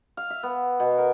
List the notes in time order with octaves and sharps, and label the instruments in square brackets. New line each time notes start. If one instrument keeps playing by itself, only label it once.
[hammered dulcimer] F5
E5
B3
B2
A#4